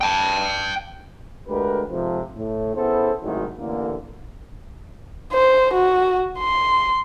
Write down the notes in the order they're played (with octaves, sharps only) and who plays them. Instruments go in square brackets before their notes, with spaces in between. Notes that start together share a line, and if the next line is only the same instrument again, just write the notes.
[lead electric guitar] G5 A5
[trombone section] D2 G#3 G4 A#4 B4
F2 G#2 C3 F3
A2
C#3 B3 E4 A4 C5
G#1 A2 C3 D#3 F#3 E4
A1 D3 A#3
[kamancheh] C5
F#4
C6